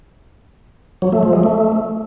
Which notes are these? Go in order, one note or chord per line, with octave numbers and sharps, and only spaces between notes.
F#3
A3
F3
G#3
A3